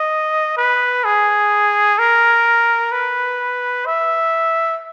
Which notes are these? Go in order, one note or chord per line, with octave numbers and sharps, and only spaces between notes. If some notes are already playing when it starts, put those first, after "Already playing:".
Already playing: D#5
B4
G#4
A#4
B4
E5